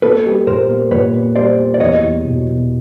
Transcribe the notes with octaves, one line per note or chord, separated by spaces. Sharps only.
A#3 A4 B4
G3
A#2 A#4 C5
A#3
A#2 B4 C#5
A#3
G3 C5 D5
A#3
D5
E2 C#5 D#5
E2
B2
B2